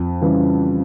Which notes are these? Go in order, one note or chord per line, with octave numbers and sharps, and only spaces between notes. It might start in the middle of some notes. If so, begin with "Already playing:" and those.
Already playing: F2
C#3 E3 G3